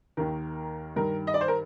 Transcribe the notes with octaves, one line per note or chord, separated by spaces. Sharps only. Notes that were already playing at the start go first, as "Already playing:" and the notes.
D#2 D#3 A#4
G2 D#3 A#4
D#5
D5
C5
A#4